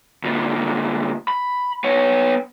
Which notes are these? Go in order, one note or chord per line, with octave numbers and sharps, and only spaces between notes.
D2 A#2
B5
B3 C#5